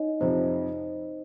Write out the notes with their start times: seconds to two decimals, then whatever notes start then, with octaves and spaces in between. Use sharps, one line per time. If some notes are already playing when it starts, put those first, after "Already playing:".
Already playing: D#4 C#5 D#5
0.20 F2 C3 F3 C4 C5